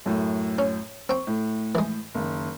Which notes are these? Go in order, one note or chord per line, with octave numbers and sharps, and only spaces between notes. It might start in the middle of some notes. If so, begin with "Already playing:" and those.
F#2 A2
C#4
C4 G5 C#6
A2
E3 G#3
F#1 D#3